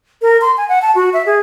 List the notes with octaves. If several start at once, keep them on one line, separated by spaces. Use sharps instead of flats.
A#4
C6
G#5
F#5
A5
F#4
E5
G#4